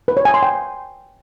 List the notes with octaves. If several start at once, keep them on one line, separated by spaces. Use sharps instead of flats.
B4
C#5
G#5
C6
G5